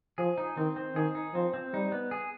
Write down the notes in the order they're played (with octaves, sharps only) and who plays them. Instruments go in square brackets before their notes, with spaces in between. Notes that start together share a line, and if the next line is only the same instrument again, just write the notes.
[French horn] F3 [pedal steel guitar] G#4
[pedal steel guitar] D#4
[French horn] D#3 [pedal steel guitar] C4
[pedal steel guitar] C4
[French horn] D#3 [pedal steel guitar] G#4
[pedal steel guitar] D#4
[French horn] F3 [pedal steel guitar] C4
[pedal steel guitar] C4
[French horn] G3 [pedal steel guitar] D#4
[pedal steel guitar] B3
G#4